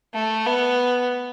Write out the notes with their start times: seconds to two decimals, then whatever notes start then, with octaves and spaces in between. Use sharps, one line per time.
0.14 A3
0.46 B3